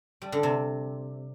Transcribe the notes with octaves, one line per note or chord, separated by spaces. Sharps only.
G3
D3
C3